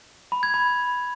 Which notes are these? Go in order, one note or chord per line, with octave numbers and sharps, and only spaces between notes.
B5
G#6
B5